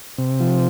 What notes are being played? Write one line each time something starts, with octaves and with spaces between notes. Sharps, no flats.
C3
F3